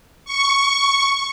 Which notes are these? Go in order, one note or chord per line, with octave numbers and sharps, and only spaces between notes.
C#6